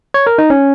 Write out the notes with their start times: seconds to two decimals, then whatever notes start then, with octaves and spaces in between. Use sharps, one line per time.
0.14 C#5
0.27 A#4
0.38 D#4
0.50 C#4